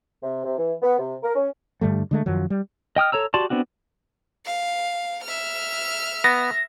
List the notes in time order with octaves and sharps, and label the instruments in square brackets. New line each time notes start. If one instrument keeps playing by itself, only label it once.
[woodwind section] C3
C3
E3
B3
C3
A#4
C#4
[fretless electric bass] G2 D3 G3 A3
D3 G#3 A3
F#2 D#3 F3 F#3
G3
[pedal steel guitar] D#5 G5 D#6 F6
A4 C#5 A#5 E6
F#4 G4 D5 A5 C6
B3 C4 D4 F#4
[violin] F5
E5 F6
[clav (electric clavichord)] B3 [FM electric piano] A#6